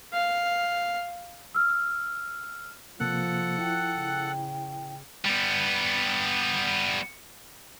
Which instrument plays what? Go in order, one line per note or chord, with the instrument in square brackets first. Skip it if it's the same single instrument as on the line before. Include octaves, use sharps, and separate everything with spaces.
[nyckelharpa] F5
[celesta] E6 F6
[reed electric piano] C3 A#3 [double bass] F3 [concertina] A4 F#5 F#6
[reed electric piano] E4 [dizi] G5
[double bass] C#3
[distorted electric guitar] G3 B3